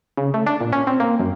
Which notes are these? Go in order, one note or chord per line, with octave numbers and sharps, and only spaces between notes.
C#3
A3
D4
A#2
C#4
C4
A#3
F#2